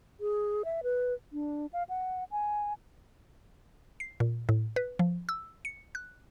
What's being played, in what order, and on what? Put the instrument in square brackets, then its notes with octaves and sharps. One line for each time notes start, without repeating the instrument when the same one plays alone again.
[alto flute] G#4
E5
B4
D4
F5
F#5
G#5
[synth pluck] C7
A#2
A2
B4
F3
E6
C#7
F#6